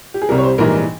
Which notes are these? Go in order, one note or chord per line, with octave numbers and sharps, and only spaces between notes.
G4
G#4
C2 C3 G3 A#4
C#5
C5
A#1 G#2 E3 G3 A#4